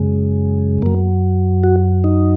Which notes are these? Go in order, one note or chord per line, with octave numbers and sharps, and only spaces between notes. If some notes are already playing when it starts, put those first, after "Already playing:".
Already playing: F#2 C#3 G#3
F#2 F#3 A#3
F#4
D#4